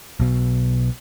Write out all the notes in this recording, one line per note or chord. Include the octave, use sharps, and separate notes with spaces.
B1 B2